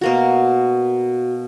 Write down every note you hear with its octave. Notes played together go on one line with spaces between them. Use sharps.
B2 A#3 F#4